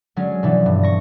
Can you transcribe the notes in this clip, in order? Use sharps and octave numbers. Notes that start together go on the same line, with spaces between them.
D3 F#3 G#3 C#4
B2 D3 E3 F3
G2
C#6 A#6